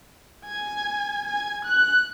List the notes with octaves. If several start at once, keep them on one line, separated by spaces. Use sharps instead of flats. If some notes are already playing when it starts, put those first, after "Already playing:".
G#5
G#5
F#6